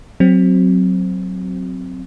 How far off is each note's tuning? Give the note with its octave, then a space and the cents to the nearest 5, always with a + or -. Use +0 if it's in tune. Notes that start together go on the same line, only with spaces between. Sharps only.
F#3 +0 C4 +0